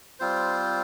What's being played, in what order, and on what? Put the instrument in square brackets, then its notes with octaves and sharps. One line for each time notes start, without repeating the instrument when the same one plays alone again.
[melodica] G3 C4 F4 C5